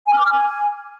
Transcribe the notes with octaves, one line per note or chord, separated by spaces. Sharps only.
G#5
F6
D6
F6
G#5